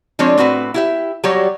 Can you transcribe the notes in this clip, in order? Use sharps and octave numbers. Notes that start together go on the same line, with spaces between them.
F3 G#3 C4 D4 C#5
A2 C4 F#4 B4
E4 G4 E5
F#3 G3 F#4 G4 C#5